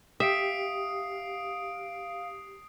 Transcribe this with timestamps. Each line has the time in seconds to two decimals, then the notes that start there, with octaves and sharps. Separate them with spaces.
0.20 G4 E5 F5 D#6 C7 D7